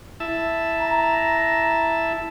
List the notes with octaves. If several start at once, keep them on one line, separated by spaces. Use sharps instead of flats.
E4 E5 A5
A#5